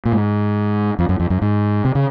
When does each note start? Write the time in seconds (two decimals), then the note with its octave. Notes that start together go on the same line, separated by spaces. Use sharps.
0.05 A#2
0.12 G#2
0.99 F2
1.09 F#2
1.20 F2
1.30 F#2
1.42 G#2
1.85 C3
1.95 C#3